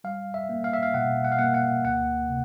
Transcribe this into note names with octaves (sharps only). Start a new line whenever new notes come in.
G3 F5
E5
A#3
F5
E5
F5
B2 F#5
F#5
F5
A#3 F#5
F#5
D2 F#5
C3